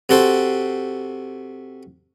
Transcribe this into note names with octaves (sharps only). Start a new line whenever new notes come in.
C3 F#4 A4 C5